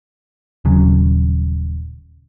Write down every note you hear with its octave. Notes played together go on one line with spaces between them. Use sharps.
D#1 C#3 F#3